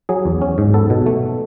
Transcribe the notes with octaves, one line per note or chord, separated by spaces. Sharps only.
F#3 G#4
E2
C#4
G#2
B3 A4
B2
A3